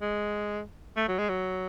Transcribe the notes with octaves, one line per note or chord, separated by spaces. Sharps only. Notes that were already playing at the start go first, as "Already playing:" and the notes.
G#3
A3
F#3
G#3
F#3